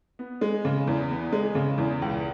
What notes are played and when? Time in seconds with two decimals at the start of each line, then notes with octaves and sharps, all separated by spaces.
0.19 B3
0.41 G#3
0.65 C#3
0.87 E2
1.11 B3
1.32 G#3
1.55 C#3
1.78 E2
2.02 C#2